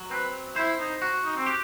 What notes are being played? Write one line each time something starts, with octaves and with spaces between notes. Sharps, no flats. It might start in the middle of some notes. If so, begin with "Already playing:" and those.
Already playing: F#3
C4 B4
E4 C5
D#4
F#4
D#4
C4
G4